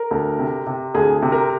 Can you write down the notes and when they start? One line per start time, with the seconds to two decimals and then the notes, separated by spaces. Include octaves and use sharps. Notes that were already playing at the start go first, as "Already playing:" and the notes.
Already playing: A#4
0.11 D2
0.39 C3
0.66 C3
0.94 D2 G#4
1.22 C3
1.32 A#4